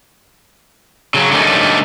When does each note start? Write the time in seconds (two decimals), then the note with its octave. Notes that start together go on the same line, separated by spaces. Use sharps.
1.14 C#3 F#3
1.31 D3 G3 A3 A#3 C#4 D#4